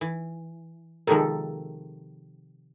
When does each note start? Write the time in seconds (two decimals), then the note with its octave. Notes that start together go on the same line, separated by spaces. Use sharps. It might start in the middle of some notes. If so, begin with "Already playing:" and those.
0.01 E3
1.07 C3 D#3 F3 G#3 A4 A#4